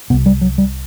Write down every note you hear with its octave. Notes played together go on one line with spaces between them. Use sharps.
C2 C3 B3
G3
F#3
G3